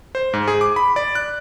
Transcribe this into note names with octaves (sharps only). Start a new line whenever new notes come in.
C5
G#2
G#4
D6
B5
D5
F#6